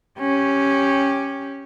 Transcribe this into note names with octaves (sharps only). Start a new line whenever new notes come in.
C#4 G4